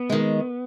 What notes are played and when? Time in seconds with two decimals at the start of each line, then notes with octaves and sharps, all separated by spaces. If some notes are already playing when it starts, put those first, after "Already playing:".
Already playing: B3
0.10 D#3 G#3